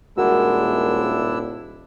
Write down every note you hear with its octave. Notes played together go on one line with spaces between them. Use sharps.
D#1 G#3 D4 E4 F#4 A#4 F#5 E6